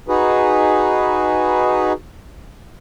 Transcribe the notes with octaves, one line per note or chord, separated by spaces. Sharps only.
D#4 F#4 G#4 B4